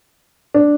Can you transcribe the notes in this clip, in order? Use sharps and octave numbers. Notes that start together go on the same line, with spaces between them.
D4